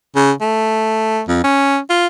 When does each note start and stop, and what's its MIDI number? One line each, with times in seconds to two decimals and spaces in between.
0.16 0.32 49
0.41 1.21 57
1.28 1.42 41
1.44 1.78 61
1.90 2.07 65